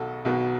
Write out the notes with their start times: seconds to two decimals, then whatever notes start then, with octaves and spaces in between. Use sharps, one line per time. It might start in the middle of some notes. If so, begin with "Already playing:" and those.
Already playing: B1 B2 F#4 A4
0.25 B1 B2 B3